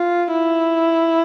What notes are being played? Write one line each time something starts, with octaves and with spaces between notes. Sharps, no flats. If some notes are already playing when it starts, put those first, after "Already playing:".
Already playing: F4
E4